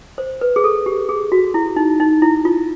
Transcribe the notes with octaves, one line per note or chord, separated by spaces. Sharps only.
C5
B4
G#4
A4
G4
G#4
F#4
E4
D#4
D#4
E4
F4